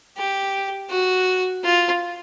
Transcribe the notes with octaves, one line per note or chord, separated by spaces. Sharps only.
G4
F#4
F4